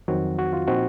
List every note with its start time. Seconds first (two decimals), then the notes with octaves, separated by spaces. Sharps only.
0.08 F2 D#3 F#3 C4 F#4
0.39 F#4
0.53 F4
0.67 A#2 F3 C4 D#4 F#4